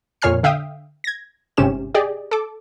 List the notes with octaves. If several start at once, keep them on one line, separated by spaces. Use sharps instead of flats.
F2 A#2 C#5 G#5 F6 C7
D3 E5 F5 G5 D#6
G#6 A#6
G1 G#2 C3 C#4 G4 E7
G4 G#4 D5 D#5
A4 D6